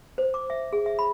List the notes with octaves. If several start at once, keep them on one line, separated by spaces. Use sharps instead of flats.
C5
D6
E5
G#4
E5
B5